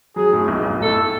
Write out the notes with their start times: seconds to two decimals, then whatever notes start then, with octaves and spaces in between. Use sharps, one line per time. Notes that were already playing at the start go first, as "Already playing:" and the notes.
0.16 F#3 G#4
0.33 A2
0.48 B1
0.65 B1
0.81 A2 A4